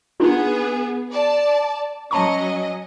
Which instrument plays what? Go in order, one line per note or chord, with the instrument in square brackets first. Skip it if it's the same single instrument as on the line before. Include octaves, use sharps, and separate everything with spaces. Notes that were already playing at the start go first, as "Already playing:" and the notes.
[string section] B3 G#4 [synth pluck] D4 D#4 F4
[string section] D5 A5
[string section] F#3 C#4 D#5 [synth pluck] A5 A#5 C#6